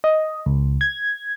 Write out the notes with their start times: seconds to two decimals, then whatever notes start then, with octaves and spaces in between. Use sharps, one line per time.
0.04 D#5
0.46 C#2
0.81 G#6